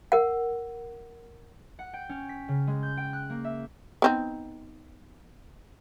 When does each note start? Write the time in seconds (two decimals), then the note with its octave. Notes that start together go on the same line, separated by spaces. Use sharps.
0.12 A#4 F#5
1.79 F#5
1.93 G5
2.09 C#4
2.29 B6
2.48 C#3
2.67 G#3
2.83 G6
2.97 G5
3.13 F#6
3.30 A#3
3.45 E5
4.02 B3 C4 D#4